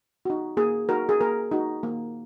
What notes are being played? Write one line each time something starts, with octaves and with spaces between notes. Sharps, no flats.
D#4 F#4
A#3 G#4
D#4 F#4 A#4
G#4
A#3 A#4
D#4 F#4
A#3